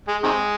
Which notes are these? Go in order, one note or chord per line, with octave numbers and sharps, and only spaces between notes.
G#3
C3 D#3 G#3